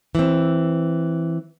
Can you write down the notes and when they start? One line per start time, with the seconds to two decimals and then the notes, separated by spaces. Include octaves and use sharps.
0.15 E3 C4